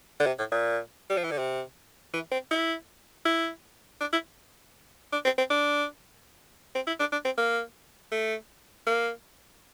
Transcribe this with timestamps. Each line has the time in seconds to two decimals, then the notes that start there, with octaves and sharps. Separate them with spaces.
0.20 D3
0.26 C3
0.39 A2
0.51 A#2
1.10 G3
1.17 F3
1.24 E3
1.31 D3
1.38 C3
2.14 E3
2.32 C4
2.51 E4
3.25 E4
4.00 D4
4.13 E4
5.13 D4
5.25 C4
5.38 C4
5.50 D4
6.75 C4
6.87 E4
7.00 D4
7.12 D4
7.25 C4
7.37 A#3
8.12 A3
8.87 A#3